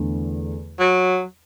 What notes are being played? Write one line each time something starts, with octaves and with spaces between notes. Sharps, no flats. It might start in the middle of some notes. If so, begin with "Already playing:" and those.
Already playing: E2 D3 A3
F#3